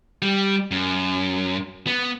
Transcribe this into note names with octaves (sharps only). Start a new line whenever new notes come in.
G3
F#2
B3